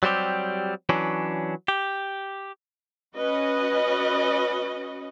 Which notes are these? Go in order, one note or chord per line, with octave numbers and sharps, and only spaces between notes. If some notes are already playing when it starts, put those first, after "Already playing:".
F#3 G3 C4 G4
E3 F#3 C#4 D4
G4
C#4 F#4 B4 D#5